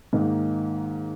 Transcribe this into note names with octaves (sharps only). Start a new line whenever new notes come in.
G#2 D#3 A#3